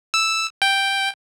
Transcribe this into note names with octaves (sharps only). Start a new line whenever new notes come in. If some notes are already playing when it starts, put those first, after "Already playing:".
E6
G5